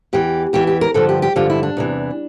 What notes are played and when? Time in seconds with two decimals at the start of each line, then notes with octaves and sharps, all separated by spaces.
0.13 E2 E3 G4
0.53 E2 E3 G4
0.67 G4
0.81 A#4
0.94 G2 D3 F3 A4
1.09 G4
1.22 G4
1.36 G2 D3 F3 F4
1.50 E4
1.63 D4
1.77 E2 C3 E3